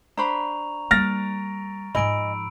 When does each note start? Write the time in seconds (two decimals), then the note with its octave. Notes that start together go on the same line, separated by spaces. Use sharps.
0.17 D4 C5 A#5 B5 C#6 F7
0.91 G3 A#3 F6 A6 A#6 D7
1.95 G#2 F3 D#5 G#5 B5 E6 D7